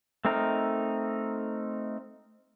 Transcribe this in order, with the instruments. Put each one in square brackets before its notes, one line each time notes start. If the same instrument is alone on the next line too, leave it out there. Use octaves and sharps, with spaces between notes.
[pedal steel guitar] A3 C4 D#4 A#4